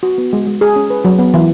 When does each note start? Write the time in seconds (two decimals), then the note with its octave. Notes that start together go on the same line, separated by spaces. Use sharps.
0.03 F#4
0.18 B3
0.33 G#3
0.47 G#3
0.61 G#4
0.76 C#4
0.90 B4
1.05 F#3
1.19 B3
1.34 E3